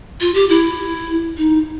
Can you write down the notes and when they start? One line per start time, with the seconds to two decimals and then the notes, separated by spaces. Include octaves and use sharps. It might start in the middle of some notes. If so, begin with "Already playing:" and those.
0.21 F4
0.34 G4
0.49 E4
1.37 D#4